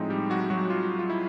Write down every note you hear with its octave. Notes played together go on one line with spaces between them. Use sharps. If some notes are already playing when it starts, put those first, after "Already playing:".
Already playing: A2 F3 G#3 C4 D#4
G3 G4
F#3 F#4
F#3 F#4
F4
F4
E4